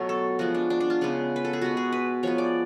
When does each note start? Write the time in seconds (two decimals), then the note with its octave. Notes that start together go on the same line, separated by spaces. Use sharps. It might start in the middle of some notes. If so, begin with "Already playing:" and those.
Already playing: B2 F#3 A3 C#5
0.09 A4
0.39 F3 G#3 B3 F#4
0.55 D4
0.70 D4
0.80 D4
0.90 F4
1.01 C#3 G#3 B3
1.36 B4
1.45 A4
1.53 G#4
1.61 B2 G#3 B3 F#4
1.77 G#4
1.92 B4
2.23 F3 G#3 B3 C#5
2.38 D5